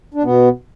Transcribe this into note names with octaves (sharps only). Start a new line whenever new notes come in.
D4
B2 B3